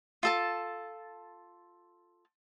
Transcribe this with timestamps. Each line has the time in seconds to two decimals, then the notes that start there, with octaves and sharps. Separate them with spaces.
0.23 F4 A4 A5